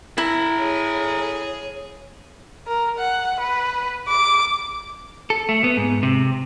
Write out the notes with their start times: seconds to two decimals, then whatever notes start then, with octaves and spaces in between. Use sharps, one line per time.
0.18 E4 A4 A#5
0.59 G#4 C#5
2.67 A#4
2.99 F#5
3.40 B4
4.08 D6
5.30 A4
5.49 A3
5.64 B3
5.77 G#2
6.03 C3